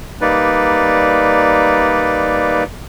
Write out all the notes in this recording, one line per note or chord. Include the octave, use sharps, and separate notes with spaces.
G3 A#3 D#4 B4 D5